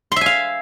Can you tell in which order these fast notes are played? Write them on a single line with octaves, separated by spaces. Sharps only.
C6 E5 G#5 F5